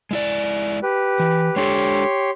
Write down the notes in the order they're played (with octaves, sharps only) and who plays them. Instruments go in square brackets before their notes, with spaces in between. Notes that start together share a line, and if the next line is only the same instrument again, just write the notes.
[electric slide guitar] G#3 E4 D5
[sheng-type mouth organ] G4 B4
[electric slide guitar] E3
[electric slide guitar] G#3 D4 A4 [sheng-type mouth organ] G4 C#5 C6